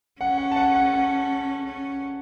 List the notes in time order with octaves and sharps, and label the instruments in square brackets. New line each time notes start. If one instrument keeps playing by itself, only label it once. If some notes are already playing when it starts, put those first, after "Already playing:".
[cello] C#4 [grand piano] F#5
[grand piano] F#5
A5
F#5
F#5
F#5
[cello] C#4